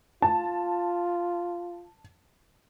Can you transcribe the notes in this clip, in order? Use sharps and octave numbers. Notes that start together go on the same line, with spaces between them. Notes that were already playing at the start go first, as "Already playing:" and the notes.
F4 A5